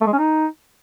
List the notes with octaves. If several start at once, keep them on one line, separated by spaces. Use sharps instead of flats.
A3
G#3
C#4
D#4